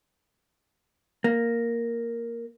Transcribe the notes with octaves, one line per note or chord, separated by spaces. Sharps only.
A#3